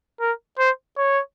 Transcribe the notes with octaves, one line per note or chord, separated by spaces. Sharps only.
A#4
C5
C#5